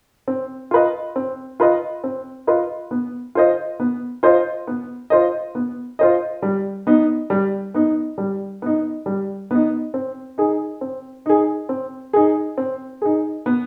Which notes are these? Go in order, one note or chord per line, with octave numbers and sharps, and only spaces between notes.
C4
F4 B4 D#5
C4
F4 B4 D#5
C4
F4 B4 D#5
B3
F4 C5 D#5
B3
F4 C5 D#5
B3
F4 C5 D#5
B3
F4 C5 D#5
G3
B3 D#4
G3
B3 D#4
G3
B3 D#4
G3
B3 D#4
C4
D#4 G#4
C4
D#4 G#4
C4
D#4 G#4
C4
D#4 G#4
B3